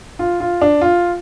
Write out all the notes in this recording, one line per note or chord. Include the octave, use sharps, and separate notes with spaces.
F4
F4
D4
F4